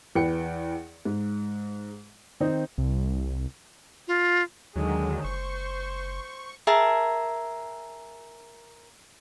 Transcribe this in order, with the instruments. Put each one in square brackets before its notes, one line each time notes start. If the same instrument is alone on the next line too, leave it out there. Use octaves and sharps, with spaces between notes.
[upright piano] E2 B4 G5 C#7
G#2
D#3 C4 D#4
[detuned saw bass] C2
[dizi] F4
[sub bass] D#2 [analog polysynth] D3 D#3 F#3 [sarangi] G#3
[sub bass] F#1 [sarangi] C5 [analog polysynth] C#6
[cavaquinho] G#4 A#4 E5 A5